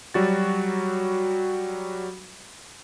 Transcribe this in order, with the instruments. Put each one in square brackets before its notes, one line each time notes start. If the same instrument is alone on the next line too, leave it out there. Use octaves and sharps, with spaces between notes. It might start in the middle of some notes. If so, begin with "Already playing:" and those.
[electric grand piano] F#3 G3 F#4 A6